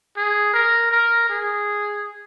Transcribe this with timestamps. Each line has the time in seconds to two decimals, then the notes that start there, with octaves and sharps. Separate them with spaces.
0.17 G#4
0.53 A#4
0.91 A#4
1.29 G#4